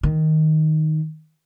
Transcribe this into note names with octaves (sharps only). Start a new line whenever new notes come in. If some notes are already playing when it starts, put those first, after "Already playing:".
D#3